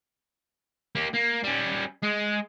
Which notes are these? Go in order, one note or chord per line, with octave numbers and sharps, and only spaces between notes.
A#3 G4
A#3
G3 C#4
G#3